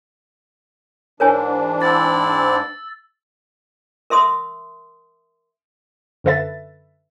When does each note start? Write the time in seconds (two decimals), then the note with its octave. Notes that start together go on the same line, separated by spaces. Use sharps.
1.20 G#2 E3 D4 A#4 C#5 G#5
1.82 C4 E4 D5 E6 A6
4.10 A#4 E5 C6 D#6 E6
6.24 F#2 D3 A4 B4 E5 A6